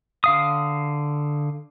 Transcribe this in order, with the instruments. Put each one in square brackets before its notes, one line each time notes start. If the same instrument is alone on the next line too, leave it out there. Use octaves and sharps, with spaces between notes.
[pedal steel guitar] D3 F5 D#6